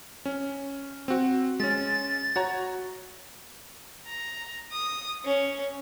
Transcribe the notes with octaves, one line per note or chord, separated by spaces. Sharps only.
C#4
C4 F#4
G#3 C#4 A6
F#4 C#5 A#5
A#5
D#6
C#4